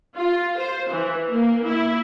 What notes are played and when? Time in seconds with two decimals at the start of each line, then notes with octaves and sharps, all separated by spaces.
0.16 F4
0.58 C5
0.89 E3
1.31 A#3
1.67 E4